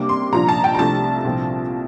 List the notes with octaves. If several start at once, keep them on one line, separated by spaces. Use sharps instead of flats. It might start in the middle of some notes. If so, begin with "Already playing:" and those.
Already playing: C3 G3 A#3 D4 D6
C6
C2 A#2 F3 A#3 D4 A#5
A5
G5
A#5
C2 C3 F3 A3 D4 A5
C2 A#2 F3 C4